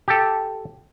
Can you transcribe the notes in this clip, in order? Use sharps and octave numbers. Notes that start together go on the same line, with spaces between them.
G4 A4